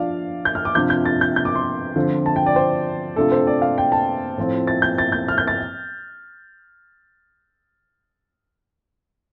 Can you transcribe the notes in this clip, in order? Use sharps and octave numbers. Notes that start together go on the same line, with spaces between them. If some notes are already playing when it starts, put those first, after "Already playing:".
Already playing: F3 D4 F4 D5 F5
G6
F6
D6
C3 F3 D4 F4 G6
G6
A6
G6
G6
D6
C6
D3 F3 C4 F4
A5
G5
D5
C5
C3 A3 D4 F4 A4
C5
D5
F5
G5
A5
A2 F3 C4 F4
A6
G6
A6
G6
F6
G6
A6